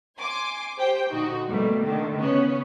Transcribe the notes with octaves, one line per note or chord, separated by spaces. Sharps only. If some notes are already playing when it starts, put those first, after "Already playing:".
G#5 C6 D6
G4 C5 G5
A#2 D3 D#4 F#4
B2 G3 A3 A#3
D3 D#3 A3
C#3 B3 C#4